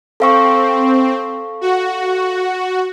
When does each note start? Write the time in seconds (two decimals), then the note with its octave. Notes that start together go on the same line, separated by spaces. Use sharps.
0.20 C4 A4 F5 C#6
1.61 F#4